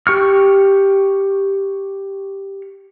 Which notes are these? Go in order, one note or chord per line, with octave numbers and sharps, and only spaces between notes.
G4 C#6 F6